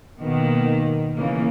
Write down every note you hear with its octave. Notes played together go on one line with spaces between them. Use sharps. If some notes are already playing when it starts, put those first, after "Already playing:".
B2 D#3 A#3
C#3 E3 A#3